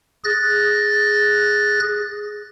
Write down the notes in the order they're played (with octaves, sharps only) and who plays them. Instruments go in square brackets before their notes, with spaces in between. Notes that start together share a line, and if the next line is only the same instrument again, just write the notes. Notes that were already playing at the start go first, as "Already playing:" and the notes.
[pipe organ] G#4 F#6 A6 A#6